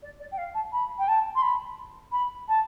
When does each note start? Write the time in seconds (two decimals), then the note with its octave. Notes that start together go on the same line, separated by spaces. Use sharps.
0.02 D5
0.20 D5
0.32 G5
0.38 F5
0.54 A5
0.72 B5
0.99 G5
1.08 A5
1.35 C6
1.42 B5
2.12 B5
2.48 A5